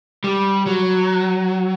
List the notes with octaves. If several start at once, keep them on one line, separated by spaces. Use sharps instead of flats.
G3
F#3